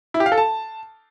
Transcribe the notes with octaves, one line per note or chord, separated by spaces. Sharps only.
E4
G4
F5
A4
A5